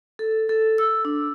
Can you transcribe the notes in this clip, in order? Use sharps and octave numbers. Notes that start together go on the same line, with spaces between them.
A4
A4
E6
D4